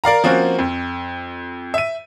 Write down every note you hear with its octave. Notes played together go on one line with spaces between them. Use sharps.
A#4 D5 F5 A#5
F3 A#3 C4 C#4 F#4
F2
E5 D#7